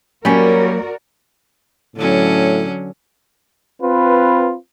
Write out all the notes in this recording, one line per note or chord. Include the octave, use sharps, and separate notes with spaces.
F#3 G3 A#3 C#4 F#4 A#4 D5
A2 D3 F#3 C#4
C4 F4 B4